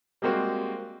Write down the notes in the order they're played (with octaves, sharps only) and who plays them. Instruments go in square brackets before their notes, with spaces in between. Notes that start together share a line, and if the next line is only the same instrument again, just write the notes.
[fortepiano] G3 G#3 A#3 C4 F#4